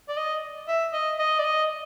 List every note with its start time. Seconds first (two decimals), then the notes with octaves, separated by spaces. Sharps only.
0.09 D5
0.17 D#5
0.68 E5
0.93 D#5
1.19 D#5
1.39 D5
1.44 D#5